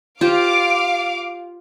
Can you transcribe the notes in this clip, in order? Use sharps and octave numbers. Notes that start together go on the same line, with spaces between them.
F4 G4 C5 F5 D6